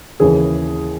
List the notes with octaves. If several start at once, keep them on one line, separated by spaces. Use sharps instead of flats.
D#2 C#3 E3 G#4